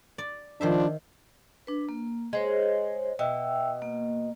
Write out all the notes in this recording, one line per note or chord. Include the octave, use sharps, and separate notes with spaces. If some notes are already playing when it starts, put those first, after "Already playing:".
D5
D#3 F3 D4 C5 E5
D4 B4
A#3
G#3 G#4 C5 C#5
B2 E5 G5 E6
A#3